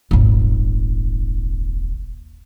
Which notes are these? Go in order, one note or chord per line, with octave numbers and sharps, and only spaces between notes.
D#1 G#1